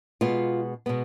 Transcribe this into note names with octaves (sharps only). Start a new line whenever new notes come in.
B2 G#3 B3 F4
B2 G#3 B3